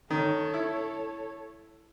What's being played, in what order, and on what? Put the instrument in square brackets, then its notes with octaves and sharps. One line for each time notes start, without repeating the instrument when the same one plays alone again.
[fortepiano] D#3 [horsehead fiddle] A4 C#5
[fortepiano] E4